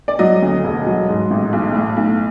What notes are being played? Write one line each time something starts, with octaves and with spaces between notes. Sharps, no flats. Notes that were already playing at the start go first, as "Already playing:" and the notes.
D5
F#3 D#5
D2
E1
F#3
G#2
A1
B1
A2
B1